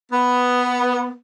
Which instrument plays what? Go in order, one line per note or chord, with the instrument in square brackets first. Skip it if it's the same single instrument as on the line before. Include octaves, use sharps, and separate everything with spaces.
[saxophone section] B3